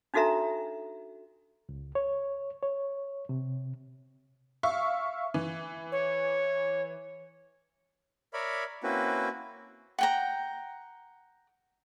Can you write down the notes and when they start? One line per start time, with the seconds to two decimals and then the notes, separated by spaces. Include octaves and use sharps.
0.14 D4 D#4 F#4 A4 E5 A#5
1.69 C#2
1.95 C#5
2.63 C#5
3.29 C3
4.63 E5 F5 C#6
5.34 E3
5.92 C#5
8.33 A#4 C#5 D5 E5 B5
8.83 A#3 C4 C#4 E4 F#4 B4
9.99 F#5 G5 A#5